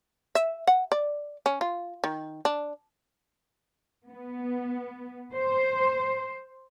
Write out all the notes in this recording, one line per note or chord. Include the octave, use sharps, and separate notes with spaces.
E5
F#5
D5
C#4
F4
D#3
D4
B3
C5